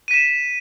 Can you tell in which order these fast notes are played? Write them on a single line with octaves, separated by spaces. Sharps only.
D#7 B6 E7